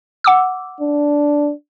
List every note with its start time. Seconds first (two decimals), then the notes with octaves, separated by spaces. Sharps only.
0.24 F#5 D6 E6
0.81 D4